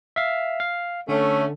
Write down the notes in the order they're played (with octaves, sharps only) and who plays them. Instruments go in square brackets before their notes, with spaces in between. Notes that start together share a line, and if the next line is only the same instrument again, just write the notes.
[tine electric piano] E5 F5
F5
[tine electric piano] D3 [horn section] A3 C#4